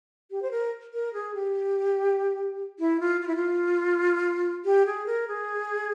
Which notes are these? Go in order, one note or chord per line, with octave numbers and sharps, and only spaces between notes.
G4
C5
A#4
A#4
G#4
G4
E4
F4
F4
E4
F4
G4
G#4
A#4
G#4